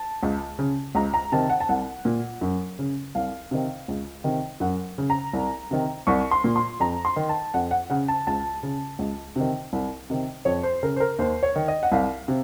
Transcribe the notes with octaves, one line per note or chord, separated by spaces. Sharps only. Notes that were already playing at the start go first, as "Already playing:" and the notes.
Already playing: A5
C#2
C#3
C#2 A#5
A#5
C3 D#3 A5
F#5
A5
C2 F#5
A#2
F#2
C#3
C2 F5
C3 D#3
C#2
C3 D#3
F#2 F#5
C#3
A#5
C2
C3 D#3
C2 C#6
C6
A#2
C6
F2 A#5
C6
D#3
A5
F2 F#5
F#5
C#3 F#5
A5
C#2 A5
C#3
C#2
C3 D#3
C2
C3 D#3
F2 C#5
C5
C#3 A#4
C5
A#4
D#2 C5
C#5
D#3
D#5
F#5
C2 F5
C3